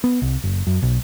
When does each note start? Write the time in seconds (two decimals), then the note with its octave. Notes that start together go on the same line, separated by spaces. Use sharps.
0.04 B3
0.22 C2
0.44 F#1
0.67 F#2
0.83 B1